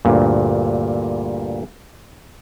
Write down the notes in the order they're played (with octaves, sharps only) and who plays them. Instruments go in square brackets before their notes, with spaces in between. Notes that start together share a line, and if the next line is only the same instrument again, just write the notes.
[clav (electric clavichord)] D2 G2 A#2